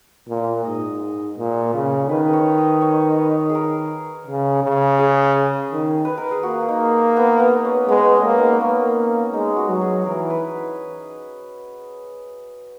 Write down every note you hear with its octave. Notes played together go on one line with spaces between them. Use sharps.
A#2
G#2 D#5
A#2
C#3
D#3 B4
C#5
D#5
C#5
B4
G#4
A#4
C#3
C#3
G#4
D#3
B4
A#4
G#4
A#3 F#4
D#4
B3
B3
C#4
G#3 B3
C#4
A#3
D#4
A#3 C#4
G#3 D#4
F#4
F#3
G#4
E3 A#4
B4